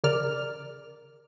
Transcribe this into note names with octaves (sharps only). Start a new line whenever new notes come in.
C#3 A#4 D5 F6